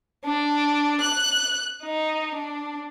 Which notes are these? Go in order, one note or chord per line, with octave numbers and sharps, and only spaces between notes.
D4
F#6
D#4
D4